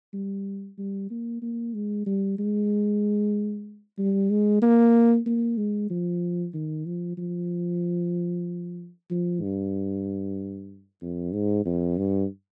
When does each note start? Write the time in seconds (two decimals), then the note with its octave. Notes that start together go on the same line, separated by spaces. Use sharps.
0.13 G3
0.78 G3
1.10 A#3
1.42 A#3
1.74 G#3
2.06 G3
2.38 G#3
3.98 G3
4.30 G#3
4.62 A#3
5.26 A#3
5.57 G#3
5.90 F3
6.54 D#3
6.86 F3
7.17 F3
9.10 F3
9.42 G2
11.01 F2
11.33 G#2
11.65 F2
11.97 G2